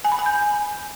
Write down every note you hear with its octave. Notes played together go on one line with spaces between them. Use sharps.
G#5
B5
G#5
G6